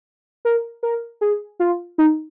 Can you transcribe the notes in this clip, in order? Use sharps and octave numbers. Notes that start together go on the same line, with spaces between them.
A#4
A#4
G#4
F4
D#4